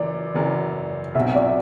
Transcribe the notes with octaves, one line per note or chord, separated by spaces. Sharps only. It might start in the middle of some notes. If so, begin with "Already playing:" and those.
Already playing: F#1 F#2 E3 D5
F#1 F#2 E3
B1 B2 F#3 C4 F#4 E5
D5